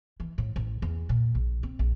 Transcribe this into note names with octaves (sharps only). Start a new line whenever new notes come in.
E3
A2
A1
E2
A#2
A#1
C4
A#1